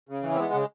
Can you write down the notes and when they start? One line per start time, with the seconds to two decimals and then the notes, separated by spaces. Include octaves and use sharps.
0.09 C#3
0.23 E3
0.35 C4
0.38 G#3 B3
0.53 C#3